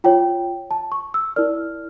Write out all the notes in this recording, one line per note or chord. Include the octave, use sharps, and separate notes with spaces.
F4 C#5 G5
A5
C#6
E6
E4 A#4 D5 F6